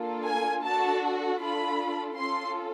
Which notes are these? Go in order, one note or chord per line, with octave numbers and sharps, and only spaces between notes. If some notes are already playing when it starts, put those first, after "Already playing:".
Already playing: A#3 D4 F4 A4
G#5
D4 F#4 A4 A5
D4 F4 A4 B5
C#4 F4 A4 C6